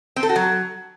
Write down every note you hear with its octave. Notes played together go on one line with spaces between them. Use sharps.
C4
A4
F#4
F#3